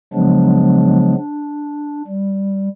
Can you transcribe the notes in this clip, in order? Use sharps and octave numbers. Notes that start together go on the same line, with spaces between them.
C#3 F3 F#3 G#3 B3 D4
D4
G3